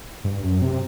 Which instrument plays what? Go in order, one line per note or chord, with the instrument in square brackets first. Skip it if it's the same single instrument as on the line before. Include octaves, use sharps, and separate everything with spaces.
[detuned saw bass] G2
F#2
C3